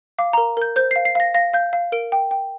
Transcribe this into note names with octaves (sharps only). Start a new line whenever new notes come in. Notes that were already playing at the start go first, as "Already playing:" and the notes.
F5 D6
A#4 A#5
A#4 G6
C5 G6
F5 C7
C7
F5 A#6
F5 A#6
F5 G6
F5
A#4 D7
G5
G5